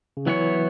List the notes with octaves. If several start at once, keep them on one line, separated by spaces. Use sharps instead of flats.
C#3
E3 F#3 B3 E4 C#5